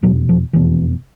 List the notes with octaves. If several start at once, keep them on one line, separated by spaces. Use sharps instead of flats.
F1 E2 B2 F#3
F3
F1 E2 B2 E3